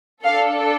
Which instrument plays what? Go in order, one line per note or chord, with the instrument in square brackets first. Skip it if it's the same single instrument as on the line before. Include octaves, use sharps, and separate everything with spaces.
[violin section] D4 A4 F5